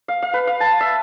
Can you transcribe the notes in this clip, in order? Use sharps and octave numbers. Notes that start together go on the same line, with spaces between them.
F5
F5
B4
F5
A5
E5